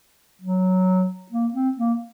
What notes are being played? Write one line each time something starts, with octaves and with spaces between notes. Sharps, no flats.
F#3
A#3
C4
A#3